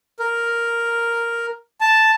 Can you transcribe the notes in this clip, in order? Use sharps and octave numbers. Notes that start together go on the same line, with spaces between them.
A#4
A5